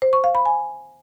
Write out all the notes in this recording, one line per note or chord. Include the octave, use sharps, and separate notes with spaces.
C5
C#6
F5
B5
G#5